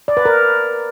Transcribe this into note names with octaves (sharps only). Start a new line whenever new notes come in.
D5
B4
A#4